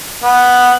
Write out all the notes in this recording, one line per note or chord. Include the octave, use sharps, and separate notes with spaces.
B3